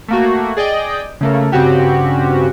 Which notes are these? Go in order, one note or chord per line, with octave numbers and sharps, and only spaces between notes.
A3 A#3 F#4
G#4 D5 D#5 G5
C#3 A3 A#3
G2 C#3 C4 C#4 F#4 G4